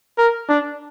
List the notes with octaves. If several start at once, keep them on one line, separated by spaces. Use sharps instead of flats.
A#4
D4